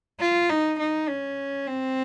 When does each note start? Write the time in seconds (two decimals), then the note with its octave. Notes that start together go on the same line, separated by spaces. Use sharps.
0.20 F4
0.50 D#4
0.79 D#4
1.08 C#4
1.67 C4